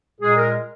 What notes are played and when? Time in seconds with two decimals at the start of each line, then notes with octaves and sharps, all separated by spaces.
0.21 A#2 G#3 G#4
0.37 A#4